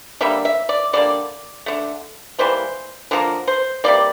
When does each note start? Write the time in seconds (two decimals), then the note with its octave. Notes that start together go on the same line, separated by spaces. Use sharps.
0.21 D3 G3 A#3 E5
0.45 E5
0.69 D5
0.93 D3 G3 A#3 D5
1.66 D3 A3
2.38 E3 G3 A#3 C5
3.11 D3 F3 A#3 A#4
3.47 C5
3.84 C3 G3 A#3 D5